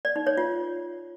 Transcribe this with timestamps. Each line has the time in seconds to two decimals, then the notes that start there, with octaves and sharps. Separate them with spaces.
0.05 D5
0.16 D#4
0.27 C#5
0.37 F4